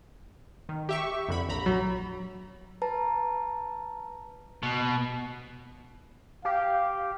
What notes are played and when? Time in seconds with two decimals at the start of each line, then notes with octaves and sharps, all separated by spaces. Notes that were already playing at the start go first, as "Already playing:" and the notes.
0.69 D#3
0.89 G4 E5 C#6
1.29 F2 D3 B5
1.49 A#1 A#5 B5
1.66 F#3
2.82 B4 A5 A#5
4.63 B2
6.45 G4 F5